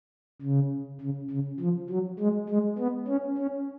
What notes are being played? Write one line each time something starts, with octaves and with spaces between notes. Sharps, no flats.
C#3
C#3
C#3
F3
F#3
G#3
G#3
B3
C#4
C#4